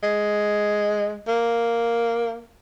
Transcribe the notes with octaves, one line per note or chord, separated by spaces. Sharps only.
G#3
A#3